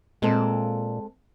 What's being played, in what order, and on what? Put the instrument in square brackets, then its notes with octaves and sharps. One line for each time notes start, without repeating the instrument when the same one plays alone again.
[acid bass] A#2 [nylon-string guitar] G#3 C4 A4